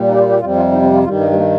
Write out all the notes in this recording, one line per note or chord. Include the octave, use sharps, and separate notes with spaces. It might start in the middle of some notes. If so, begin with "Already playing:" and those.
Already playing: A#2 G3
D#4
G4
F4
G4
F2 C3 G3 F4
F4
D#4
C4
F4
G2 D#3 G3 F4
D#4
G3
A#3